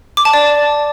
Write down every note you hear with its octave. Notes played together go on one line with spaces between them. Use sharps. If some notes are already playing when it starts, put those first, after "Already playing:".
D6
A5
D5